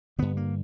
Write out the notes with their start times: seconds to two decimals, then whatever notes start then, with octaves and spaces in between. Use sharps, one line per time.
0.19 G2 D3 B3
0.37 A#3